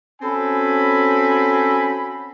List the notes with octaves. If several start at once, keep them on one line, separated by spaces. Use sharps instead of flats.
C4 C#4 F#4 A4 G#5 B5